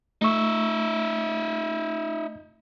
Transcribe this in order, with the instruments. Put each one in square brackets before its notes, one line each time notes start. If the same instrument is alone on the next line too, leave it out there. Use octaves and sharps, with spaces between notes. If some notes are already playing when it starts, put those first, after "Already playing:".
[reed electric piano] A3 C#6 [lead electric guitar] D#4 E5